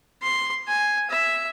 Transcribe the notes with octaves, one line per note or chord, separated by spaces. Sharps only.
C6
G#5
E5